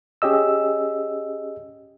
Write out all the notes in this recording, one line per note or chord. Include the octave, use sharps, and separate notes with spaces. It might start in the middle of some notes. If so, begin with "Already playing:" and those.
C#4 G4 G#4 D#5 E6